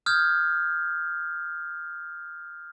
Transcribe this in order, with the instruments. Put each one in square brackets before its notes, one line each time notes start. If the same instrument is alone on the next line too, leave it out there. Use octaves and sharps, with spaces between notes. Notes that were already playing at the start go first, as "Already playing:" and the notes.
[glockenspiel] D#6 F6 G6 G#6